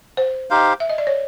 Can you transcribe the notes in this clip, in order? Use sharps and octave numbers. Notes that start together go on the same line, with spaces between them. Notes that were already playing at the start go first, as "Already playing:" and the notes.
C5
D#4 G4 C5 F5
E5
D#5
D5
C#5